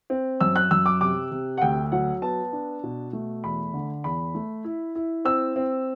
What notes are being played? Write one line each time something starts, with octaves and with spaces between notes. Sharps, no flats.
C4
F#2 E6
F#6
F#2 E6
D6
C3 D6
C3
F#5
D2 G5
F#3 F#5
B3 A5
D4
B2
A3
E2 B5
D3
E2 B5
A3
E4
E4
C4 E6
C4